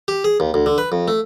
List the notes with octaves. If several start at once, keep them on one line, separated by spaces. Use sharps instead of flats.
G4
G#4
D#2
D2
D3
B4
F2
A3